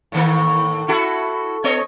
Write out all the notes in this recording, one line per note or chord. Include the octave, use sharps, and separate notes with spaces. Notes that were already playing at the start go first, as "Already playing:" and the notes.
A2 D#3 A#3
E4 F#4 A4
B3 C#5 D#5